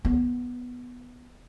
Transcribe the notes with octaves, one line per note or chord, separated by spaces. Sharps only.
B3